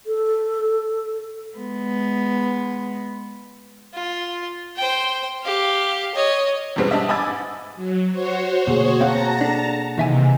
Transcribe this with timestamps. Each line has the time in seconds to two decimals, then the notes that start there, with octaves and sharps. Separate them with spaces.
0.06 A4
1.58 G#3 B3
3.94 F4
4.76 C5 G5
5.43 G4 F5
6.15 C#5 D#5
6.76 E2 B2 G3 G#3 C4
6.91 G3 D4 D#5 E5
7.09 D#5 G#5 B5 D6 E6 A6
7.28 G#2
7.75 F#3
8.11 F#4 C5 C#5
8.67 D2 B2 A#3 G#4
9.01 C4 F5 F#5 A5 A#5 A#6
9.41 D4 A4
9.98 D#2 C3 E3 D#4 E5 G#5